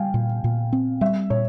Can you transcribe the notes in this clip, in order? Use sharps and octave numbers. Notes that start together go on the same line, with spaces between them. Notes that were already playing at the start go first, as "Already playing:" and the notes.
Already playing: G3 F5 G5 G#5
A#2
A#2
C4
G3 E5
A#2 C#5